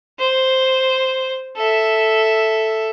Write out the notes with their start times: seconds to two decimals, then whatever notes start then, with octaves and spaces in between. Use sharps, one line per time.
0.19 C5
1.57 A4 E5